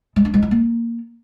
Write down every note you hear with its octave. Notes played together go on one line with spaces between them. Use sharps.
G#3
D4
G#3
E4
A#3